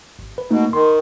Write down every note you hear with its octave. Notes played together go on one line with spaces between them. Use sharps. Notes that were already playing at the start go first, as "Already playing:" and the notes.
G#1
B4
B2 A3 A#3 D#4
D#3 C6